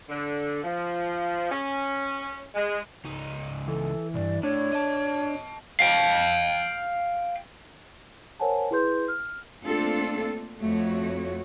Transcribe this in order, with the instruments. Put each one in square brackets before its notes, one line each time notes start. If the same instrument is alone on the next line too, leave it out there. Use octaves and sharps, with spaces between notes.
[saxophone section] D3
F3
C#4
G#3
[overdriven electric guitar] C#2 D#4
[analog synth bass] E3 [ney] A4
[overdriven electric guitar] B1 G2 [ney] D5
[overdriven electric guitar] A2 [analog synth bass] D4 [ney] C#5
[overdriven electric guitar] D#5 A5
F5 G5
[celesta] A#4 C5 C#5 F#5 G#5 A5
E4 G#4 B4 C6 G6
F6
[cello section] A3 A#3 C4 D4 F4 A4
F2 A3 F#4 C#5